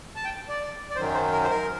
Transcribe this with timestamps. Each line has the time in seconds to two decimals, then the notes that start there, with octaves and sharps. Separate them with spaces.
0.16 A5
0.25 G5
0.49 D5
0.91 D5
0.96 F#2 D#3 F#3 C5
1.14 C5
1.32 A#4
1.44 C5
1.50 A#4